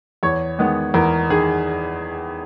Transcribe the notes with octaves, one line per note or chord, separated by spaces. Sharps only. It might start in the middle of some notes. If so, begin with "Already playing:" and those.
E2 C#5
D#3 G#3 B3
E2 A#4
D#3 G#4